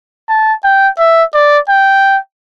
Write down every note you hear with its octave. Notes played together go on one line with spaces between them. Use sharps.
A5
G5
E5
D5
G5